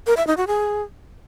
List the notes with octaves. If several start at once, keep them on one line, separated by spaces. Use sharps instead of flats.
A#4
E5
D#4
F#4
G#4